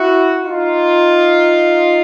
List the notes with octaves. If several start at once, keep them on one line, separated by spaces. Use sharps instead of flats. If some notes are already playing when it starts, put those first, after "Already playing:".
Already playing: E4 F#4
D#4 F4